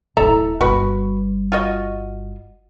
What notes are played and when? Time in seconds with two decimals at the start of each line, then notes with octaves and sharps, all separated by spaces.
0.17 D1 E4 A4 E5 A#5
0.61 G1 G3 F#4 B4
1.52 F4 F#4 D#5